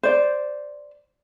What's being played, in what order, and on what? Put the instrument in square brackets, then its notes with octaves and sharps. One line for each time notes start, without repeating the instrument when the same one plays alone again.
[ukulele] C5 D5